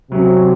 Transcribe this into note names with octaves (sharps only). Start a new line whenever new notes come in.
C3 F#3 C#4